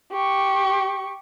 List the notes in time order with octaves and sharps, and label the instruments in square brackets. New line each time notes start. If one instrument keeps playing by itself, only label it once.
[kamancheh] G4 C#6